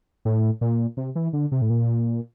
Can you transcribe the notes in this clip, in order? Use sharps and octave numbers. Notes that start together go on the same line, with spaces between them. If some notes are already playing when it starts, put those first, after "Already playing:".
A2
A#2
C3
E3
D3
C3
A2
A#2